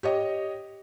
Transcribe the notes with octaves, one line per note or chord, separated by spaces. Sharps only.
G4 C#5 D#5